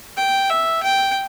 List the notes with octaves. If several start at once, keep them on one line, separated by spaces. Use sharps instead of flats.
G5
E5
G5